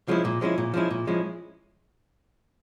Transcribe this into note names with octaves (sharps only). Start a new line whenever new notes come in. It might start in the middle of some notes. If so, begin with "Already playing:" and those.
F3 G#3 C#4 E4
A#2
F3 G#3 C#4 E4
A#2
F3 G#3 C#4 E4
A#2
F3 G#3 C#4 E4